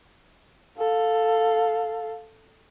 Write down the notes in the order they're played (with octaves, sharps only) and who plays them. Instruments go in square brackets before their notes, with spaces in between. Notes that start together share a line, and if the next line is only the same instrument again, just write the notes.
[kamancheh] A4 F5